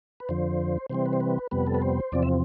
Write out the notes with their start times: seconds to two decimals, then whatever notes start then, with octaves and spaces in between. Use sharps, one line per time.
0.20 B4
0.29 F2 D3 F3 C5
0.90 C3 E3 G3 C4 C5
1.06 B4
1.13 C5
1.20 B4
1.51 F2 C3 G3 B3 B4
1.67 A4
1.75 B4
1.82 C5
2.12 E2 C3 F3 C4 D5
2.23 E5